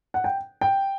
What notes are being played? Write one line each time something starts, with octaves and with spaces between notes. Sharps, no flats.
F#5
G5
G5